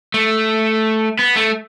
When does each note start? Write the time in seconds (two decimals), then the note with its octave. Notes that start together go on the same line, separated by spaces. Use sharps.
0.14 A3
1.19 B3
1.36 A3